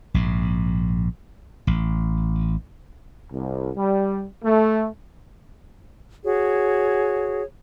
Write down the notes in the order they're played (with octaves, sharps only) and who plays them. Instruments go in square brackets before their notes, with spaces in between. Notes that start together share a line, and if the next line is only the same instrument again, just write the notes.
[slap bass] A#1 G#2
A1
[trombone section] C2
G3
A3
[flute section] F#4 G#4 C#5